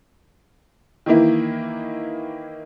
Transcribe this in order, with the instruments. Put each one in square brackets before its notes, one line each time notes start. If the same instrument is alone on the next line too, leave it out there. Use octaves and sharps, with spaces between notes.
[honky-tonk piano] D#3 E3 A#3 E4